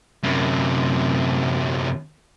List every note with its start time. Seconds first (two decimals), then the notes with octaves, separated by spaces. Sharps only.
0.23 F#2 C3